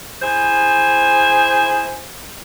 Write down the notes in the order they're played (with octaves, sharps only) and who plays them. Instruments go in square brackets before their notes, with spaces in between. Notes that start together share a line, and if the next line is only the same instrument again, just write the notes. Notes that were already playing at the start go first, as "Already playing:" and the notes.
[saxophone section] E4 G#4 C5